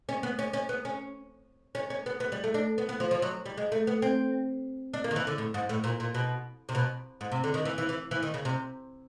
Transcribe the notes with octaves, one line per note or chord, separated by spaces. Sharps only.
C#4
B3
C#4
C#4
B3
C#4
C#4
C#4
B3
B3
G3
A3
D4
B3
B3
F3
F3
F#3
G3
G#3
A3
B3
C4
D4
A#3
D#3
E3
D3
A2
G#2
A2
A#2
A#2
B2
C3
B2
G#2
C3
D3
D#3
E3
E3
E3
E3
D#3
C#3
C3